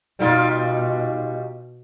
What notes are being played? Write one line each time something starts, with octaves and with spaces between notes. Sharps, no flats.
B2 G3 D#4 F4